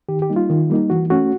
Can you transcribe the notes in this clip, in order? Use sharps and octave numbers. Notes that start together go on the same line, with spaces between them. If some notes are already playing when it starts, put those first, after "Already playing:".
D#3 G4
G4
G3 A#3 D#4
F4
D#3
G3 A#3 D#4
E3 F#4
A3 C#4 F#4